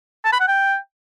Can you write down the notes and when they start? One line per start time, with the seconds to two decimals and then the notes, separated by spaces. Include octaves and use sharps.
0.25 A5
0.32 B5
0.40 F#5
0.48 G5